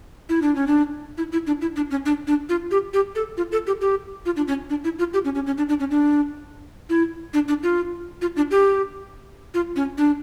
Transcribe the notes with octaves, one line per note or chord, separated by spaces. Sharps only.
E4
D4
C#4
D4
E4
E4
D4
E4
D4
C#4
D4
D4
F4
G4
G4
A4
F4
A4
G4
G4
F4
D4
C#4
D4
E4
F4
G4
C#4
C#4
C#4
D4
D4
C#4
D4
E4
D4
D4
F4
F4
D4
G4
F4
C#4
D4